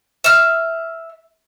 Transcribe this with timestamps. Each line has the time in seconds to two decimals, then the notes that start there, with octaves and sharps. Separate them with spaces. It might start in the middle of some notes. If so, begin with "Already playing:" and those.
0.24 E5 F6